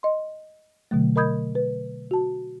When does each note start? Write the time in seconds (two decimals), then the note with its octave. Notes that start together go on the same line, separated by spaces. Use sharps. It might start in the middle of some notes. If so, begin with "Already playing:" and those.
0.03 D#5 C6
0.91 B2 D3 F#3 A3
1.16 A#4 D#5 B5 D#6 G6 G#6
1.55 B4
2.11 F#4 A5